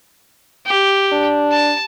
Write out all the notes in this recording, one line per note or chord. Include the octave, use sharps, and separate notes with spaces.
G4
D4
A5